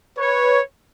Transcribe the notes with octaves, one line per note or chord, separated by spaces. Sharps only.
B4 C#5